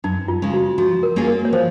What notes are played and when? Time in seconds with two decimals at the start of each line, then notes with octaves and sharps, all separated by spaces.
0.04 F#2 D#4
0.28 F4
0.42 C#3 G#3 C#4
0.54 F#4
0.78 F3 F#4
1.03 A#4
1.16 A#3 C#4 F4 G#4
1.28 A#4
1.45 C#5
1.53 F3 C5